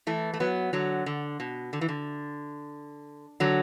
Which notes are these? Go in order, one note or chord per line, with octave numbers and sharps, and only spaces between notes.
E3 A3
A3
F#3 B3
D3 F#3
D3
B2
D3
E3
D3
D3 F#3